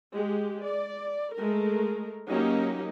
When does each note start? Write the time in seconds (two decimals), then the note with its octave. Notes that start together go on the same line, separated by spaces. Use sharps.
0.12 G#3 G4
0.64 D5
1.35 G#3 A3 A#4
2.28 F#3 A#3 C#4 D#4 G4